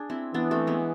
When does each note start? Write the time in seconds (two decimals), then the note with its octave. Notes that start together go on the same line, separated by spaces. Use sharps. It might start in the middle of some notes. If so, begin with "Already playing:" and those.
Already playing: D4 G#4
0.10 C4 E4
0.34 E3 B3 D4
0.51 A3 C4
0.67 G#3 B3